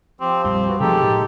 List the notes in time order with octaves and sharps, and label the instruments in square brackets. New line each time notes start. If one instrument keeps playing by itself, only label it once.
[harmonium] F3 G4 [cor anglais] C4
[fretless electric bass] A#1 F2 G3 [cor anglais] C4
[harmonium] B3 F#4
[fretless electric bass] C3 F3 A3 [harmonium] G#3 D#4 A4 [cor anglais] G4
[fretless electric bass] A2